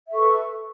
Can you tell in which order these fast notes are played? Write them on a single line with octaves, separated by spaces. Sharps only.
E5 A4 C#6 B4